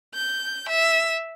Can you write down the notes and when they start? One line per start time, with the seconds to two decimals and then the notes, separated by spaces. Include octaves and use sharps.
0.14 G6
0.69 E5